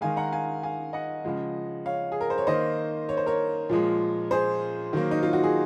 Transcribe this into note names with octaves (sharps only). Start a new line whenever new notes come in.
D#3 G#3 F5 G#5
F#5 A#5
F5 G#5
F5 G#5
D#5 F#5
C#3 F3 G#3
C#5 F5
G#4
A#4
C5
C#5
D#3 A#3 C5 D#5
C#5
C5
A#4 C#5
A#2 F3 G#3
G#4 C5
D#3 F#3 A#3
D#4
F4
F#4
G#4